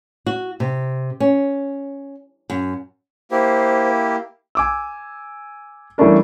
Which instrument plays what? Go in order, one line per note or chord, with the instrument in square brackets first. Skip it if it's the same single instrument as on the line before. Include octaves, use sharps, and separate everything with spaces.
[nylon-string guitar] F#4
C3
C#4
F#2
[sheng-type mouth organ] A#3 E4 G4 [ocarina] C5
[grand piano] G#5 D6 E6
E3 G3 A3 C#4 D4 A#4